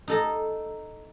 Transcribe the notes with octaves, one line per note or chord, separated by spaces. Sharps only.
D#4 A4 A#5